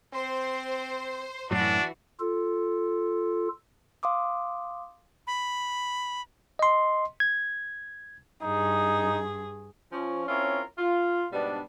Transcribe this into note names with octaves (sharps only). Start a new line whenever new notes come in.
C4 C5
F#2 A2 E3 F#3 D4 F#4
F4 A4
F5 C6 D6 D#6
B5
D#5 C6
G#6
G2 D#4 G#4
F3 C#4
C4 C#4 E4 F4 A#4 C#5
F4
G#2 B2 G3 B3 D4